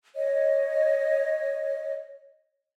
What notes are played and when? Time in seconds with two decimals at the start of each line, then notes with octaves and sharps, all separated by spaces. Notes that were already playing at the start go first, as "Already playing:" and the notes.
0.16 C#5 D#5